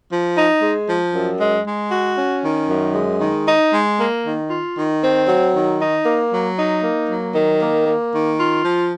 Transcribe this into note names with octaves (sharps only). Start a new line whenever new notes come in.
F3
D#4
G#3
F3
F#2
G#3
G#3
F#4
C#4
D#3
F#2
G#3
D#3
D#4
G#3
A#3
D#3
F4
D#3
C4
F#3
D#3
D#4
A#3
F#3
D#4
A#3
F#3
D#3
A#3
A#3
D#3
F4
F3